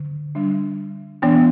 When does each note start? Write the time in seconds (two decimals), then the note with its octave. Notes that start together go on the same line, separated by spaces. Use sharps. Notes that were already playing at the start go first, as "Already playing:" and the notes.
Already playing: D3
0.35 G3 D4
1.22 E3 B3 D4 G5